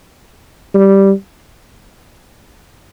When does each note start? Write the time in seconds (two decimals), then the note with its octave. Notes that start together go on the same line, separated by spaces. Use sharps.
0.74 G3